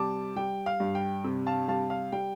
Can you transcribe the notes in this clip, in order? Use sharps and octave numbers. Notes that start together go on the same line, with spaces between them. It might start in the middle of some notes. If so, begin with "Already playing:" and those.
Already playing: C3 G3 A5 D6
G3 G5
F5
G2
G5
C3
F5 A5
G3 F5 A5
F5
G3 G5